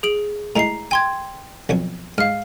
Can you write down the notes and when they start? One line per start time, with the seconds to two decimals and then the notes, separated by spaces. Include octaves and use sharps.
0.03 G#4 D7 F#7
0.56 A2 G#3 E4 A#5 C7
0.91 G5 G#5 C6 G#6
1.69 B1 F2 C#5
2.18 G#2 F5 F6